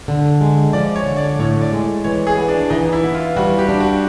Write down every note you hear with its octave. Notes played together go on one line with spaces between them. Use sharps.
D3
G#3
F3 D5
C#5
D3
D5
A2 C#5
D5
G#3
E3 C#5
G#4
B3
D4
E3 D#4
E4
B3
F4
G3 F#4
G4
D4
F#4